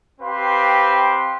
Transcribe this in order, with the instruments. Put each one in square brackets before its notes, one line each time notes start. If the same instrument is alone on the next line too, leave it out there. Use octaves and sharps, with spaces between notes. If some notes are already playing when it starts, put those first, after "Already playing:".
[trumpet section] C4 G4 B4 F5 C6